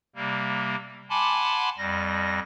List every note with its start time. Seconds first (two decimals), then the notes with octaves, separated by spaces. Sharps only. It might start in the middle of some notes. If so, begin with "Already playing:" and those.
0.15 C3 G3 A#3
1.10 F#5 G#5 A5 B5 C6 D6
1.78 F2 G3 A#6